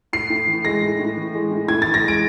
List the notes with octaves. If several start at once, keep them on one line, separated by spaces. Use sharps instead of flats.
A2 C7
A2
E3
G#3 A#6
A2
A2
E3
G#3
A2
A2 G#6
E3 A6
A#6
G#3
D7